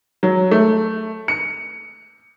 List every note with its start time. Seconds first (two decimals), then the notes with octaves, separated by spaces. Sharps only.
0.23 F#3
0.51 A3
1.28 C#7